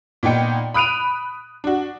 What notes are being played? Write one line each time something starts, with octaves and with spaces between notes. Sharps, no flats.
A#2 B3 D#4 G5 C#7
B5 D#6 F#6 D7 D#7 F7
D4 F#4